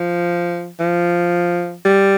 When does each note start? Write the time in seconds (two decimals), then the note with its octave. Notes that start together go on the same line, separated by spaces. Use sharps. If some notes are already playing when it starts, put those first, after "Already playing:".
Already playing: F3
0.80 F3
1.85 G3